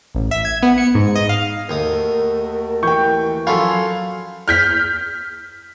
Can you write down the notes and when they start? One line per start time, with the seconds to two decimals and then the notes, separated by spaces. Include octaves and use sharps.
0.15 A1
0.31 E5
0.45 G#6
0.63 B3
0.78 C#7
0.95 G#2
1.16 D#5
1.29 F5
1.69 D#2 A3 F#4 A#4 D#6
2.83 E3 G5 C#6 G6
3.47 F3 F#3 C#4 F4 A4 F5 B5
4.48 F6 G6 B6